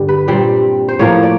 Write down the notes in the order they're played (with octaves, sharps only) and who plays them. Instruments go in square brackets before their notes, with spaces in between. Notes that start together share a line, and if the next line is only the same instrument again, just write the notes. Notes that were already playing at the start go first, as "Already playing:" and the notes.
Already playing: [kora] G2 D3 G3
B4
A#2 G3 C4
C5
A2 F3 A#3 C#5
D5